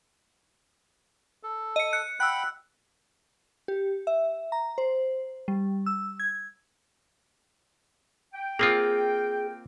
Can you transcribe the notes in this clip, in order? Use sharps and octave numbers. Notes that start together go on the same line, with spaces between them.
A4
D#5 C#7
F#6 C#7
F#5 G5 B5 E6 F#6
G4
E5
A#5
C5
G3
E6
G#6
G5
A#3 C4 F4 G#4